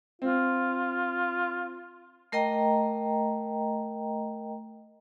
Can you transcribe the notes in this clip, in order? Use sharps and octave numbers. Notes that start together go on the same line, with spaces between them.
C4 F4
A3 A#4 D#5 G5 A#5